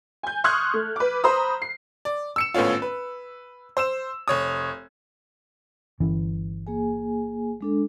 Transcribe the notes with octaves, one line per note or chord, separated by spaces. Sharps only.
G#5 G6
C6 C#6 D#6 F6 F#6 G#6
A3
B4 D6
C5 A#5 B5 D#6
C7
D5
E6 C#7 E7
G#1 A2 B3 C#4 F4
B4
C5 E6 E7
F1 C#5 D#6
G1 E3 C#4
A#3 G#4 G#5
G#3 D4 A4